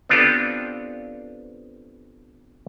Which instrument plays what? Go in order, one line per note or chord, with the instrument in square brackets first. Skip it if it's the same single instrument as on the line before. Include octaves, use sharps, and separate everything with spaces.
[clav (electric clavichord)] B3 C4 D4 F4 G4 A4